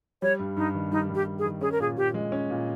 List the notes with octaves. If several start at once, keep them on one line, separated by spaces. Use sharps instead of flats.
G3 C#5
G2
G2 D#4
D#3
G3 D#4
G2
G4
G2
G#4
D#3
C#4 G#4
A#4
A#2 G#4
A#2 G4
G#3
C#4
A#2